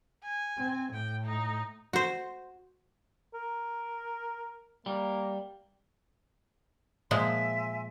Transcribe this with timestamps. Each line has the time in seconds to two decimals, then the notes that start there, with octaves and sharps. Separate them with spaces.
0.23 G#5
0.58 C4
0.93 A2 G5
1.25 D#4
1.93 F#4 C5
3.34 A#4
4.86 G3 A#3
7.11 A#2 F3 G#3 E5 G#5 C6